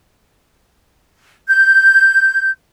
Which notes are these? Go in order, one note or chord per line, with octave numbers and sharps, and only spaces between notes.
G6